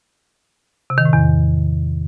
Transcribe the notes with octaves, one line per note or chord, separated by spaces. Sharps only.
C3
D#3
A2
E2